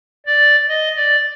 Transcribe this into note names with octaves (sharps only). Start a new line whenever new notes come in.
D5
D#5
D5